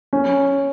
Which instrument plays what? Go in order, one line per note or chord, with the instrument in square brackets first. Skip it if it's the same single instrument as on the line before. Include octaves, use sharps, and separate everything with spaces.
[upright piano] C#4